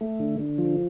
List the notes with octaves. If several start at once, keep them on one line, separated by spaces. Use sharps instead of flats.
A3
D3
D3
F3